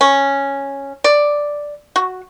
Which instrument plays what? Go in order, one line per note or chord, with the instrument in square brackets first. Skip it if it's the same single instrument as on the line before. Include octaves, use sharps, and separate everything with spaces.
[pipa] C#4
D5
F#4